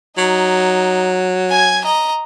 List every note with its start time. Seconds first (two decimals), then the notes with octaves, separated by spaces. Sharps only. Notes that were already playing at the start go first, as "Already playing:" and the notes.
0.18 F#3 D#4
1.50 G#5 G#6
1.84 D#5 A#5